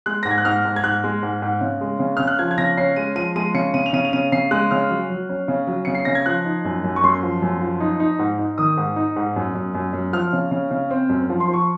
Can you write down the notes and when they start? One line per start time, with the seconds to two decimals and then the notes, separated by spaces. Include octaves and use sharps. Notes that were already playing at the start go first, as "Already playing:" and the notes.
0.06 G#3 F#6
0.23 G#2 A#6
0.31 G#6
0.38 F#6
0.45 G#2 F6
0.65 G#2
0.76 G#6
0.83 G#2 F#6
1.04 G#3
1.23 G#2
1.42 G#2
1.61 C#3
1.81 G#3
2.00 C#3
2.17 C#3 F6
2.27 F#6
2.39 F3 G#6
2.51 G#6
2.58 C#3 A#6
2.77 C#4 C7
2.96 G#3 D#7
3.16 F3 D#7
3.36 G#3 D#7
3.54 C#3 C#7
3.74 C#3 D#7
3.86 F7
3.93 C#3 D#7
4.05 F7
4.13 C#3 D#7
4.32 C#3 C7
4.51 G#3 F#6
4.71 C#3 F6
4.90 F#3
5.10 F#3
5.29 C#4
5.48 C#3
5.67 F#3
5.85 C#3 C#7
5.95 C7
6.05 C#3 A#6
6.15 G#6
6.26 F3 F#6
6.45 D#4
6.65 F#2
6.84 F#2
6.96 C#6
7.03 F#2 C6
7.23 F3
7.42 F#2
7.61 F3
7.80 D#4
8.00 D#4
8.19 G#2
8.39 D#4
8.58 D#3 D#6
8.77 G#2
8.96 D#4
9.16 G#2
9.36 F#2
9.55 F#2
9.75 F#2
9.93 F#2
10.13 F3 F6
10.33 C#3
10.51 C#3
10.71 C#3
10.90 C4
11.09 F#2
11.30 F3
11.40 C6
11.48 F3
11.54 C#6